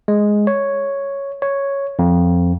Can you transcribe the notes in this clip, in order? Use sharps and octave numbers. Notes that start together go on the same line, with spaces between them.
G#3
C#5
C#5
F2